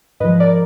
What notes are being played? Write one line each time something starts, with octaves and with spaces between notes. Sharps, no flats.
G#2 F3 B4 D#5
A#4 D5